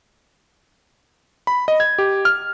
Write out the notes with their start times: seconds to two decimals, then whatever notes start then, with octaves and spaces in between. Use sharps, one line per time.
1.47 B5
1.68 D#5
1.80 G#6
1.98 G4
2.25 F6